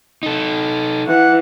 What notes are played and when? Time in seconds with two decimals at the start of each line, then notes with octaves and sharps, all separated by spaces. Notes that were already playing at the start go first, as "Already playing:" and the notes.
0.23 D#4 A4
1.08 E3 F#5